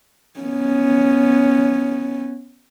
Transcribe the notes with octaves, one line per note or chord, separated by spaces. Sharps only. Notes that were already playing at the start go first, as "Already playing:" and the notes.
B3 C#4